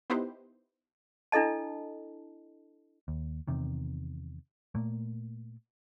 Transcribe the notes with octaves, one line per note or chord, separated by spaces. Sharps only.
B3 D#4 E4 G4 B4 C5
D4 E4 A4 D#5 A5
D#2
E2 C3 D#3
A#2 A3 A#3